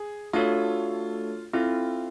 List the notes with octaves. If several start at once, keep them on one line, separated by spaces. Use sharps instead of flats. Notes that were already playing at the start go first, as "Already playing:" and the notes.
Already playing: G#4
A3 D4 F4 F#4 A4 C#5
C4 E4 F4 A4